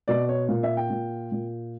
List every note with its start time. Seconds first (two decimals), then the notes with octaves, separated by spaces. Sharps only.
0.08 B2 D5
0.29 C#5
0.49 A#2
0.63 E5
0.77 G5
0.90 A#2
1.32 A#2